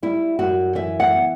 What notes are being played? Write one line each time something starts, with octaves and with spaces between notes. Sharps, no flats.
G3 E4
F#2 F#4
E3 E5
F#5
B3